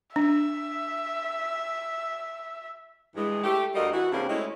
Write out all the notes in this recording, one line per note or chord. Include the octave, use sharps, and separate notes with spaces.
D4 E5
G2 E3 G#3
A3 G4
D2 G3 A#3 F#4 A#4 D#5
E3 F#4
G2 C#3 G3 A#3 C4
G#3 A3 C#4 E4